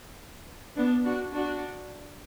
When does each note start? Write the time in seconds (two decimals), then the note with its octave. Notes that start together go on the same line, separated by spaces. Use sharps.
0.76 B3 D4
1.04 D4 F#4
1.33 D4 F#4